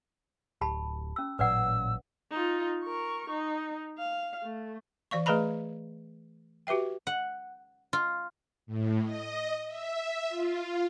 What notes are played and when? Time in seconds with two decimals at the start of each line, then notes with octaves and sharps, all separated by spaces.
0.61 D1 G4 A5 B5
1.16 C#4 E6
1.39 A1 A#2 F#3 B4 D5 F#5 E6
2.31 D#4 F4
2.83 A#4 C#6
3.30 D#4
3.98 F5
4.43 A3
5.11 E3 D5 F5 C#6
5.26 A3 G#4 B4 D#5 A#5 B5
6.67 F#4 G4 B4 E5 G5
7.07 F#5
7.93 F4
8.66 A2
9.03 D#5
9.67 E5
10.29 F4